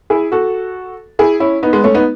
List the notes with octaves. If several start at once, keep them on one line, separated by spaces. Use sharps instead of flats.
E4 G#4
F#4 A4
E4 G#4
C#4 E4
B3 D#4
G#3 B3
A3 C#4
B3 D#4